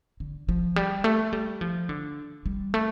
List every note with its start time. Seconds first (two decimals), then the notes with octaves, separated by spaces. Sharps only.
0.20 D3
0.49 F3
0.76 G3
1.04 A3
1.33 G3
1.61 F3
1.89 D3
2.46 G3
2.74 A3